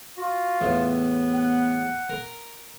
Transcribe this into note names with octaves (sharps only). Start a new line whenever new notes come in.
F4 F#4
E2 A2 B3
F#5
A#4